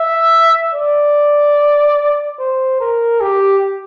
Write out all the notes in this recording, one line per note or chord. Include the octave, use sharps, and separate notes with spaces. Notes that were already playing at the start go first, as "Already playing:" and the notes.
Already playing: E5
D5
C5
A#4
G4